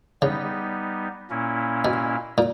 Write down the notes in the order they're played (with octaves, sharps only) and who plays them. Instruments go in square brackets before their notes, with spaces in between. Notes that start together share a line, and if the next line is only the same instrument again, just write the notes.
[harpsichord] C#3 [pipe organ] G3 B3 D#4
[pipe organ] A#2 A#3 C#4 E4
[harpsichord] B2
A#2